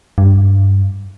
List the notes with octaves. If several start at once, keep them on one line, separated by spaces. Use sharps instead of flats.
G2